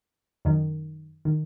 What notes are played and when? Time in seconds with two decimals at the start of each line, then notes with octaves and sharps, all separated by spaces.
0.45 F#2 D#3
1.25 D#3